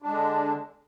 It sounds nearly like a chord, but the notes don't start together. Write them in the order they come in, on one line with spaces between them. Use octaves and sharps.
D4 G#3 D3